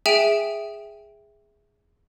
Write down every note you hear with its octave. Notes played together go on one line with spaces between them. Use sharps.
G#4 E5 G5 G#5 D7 E7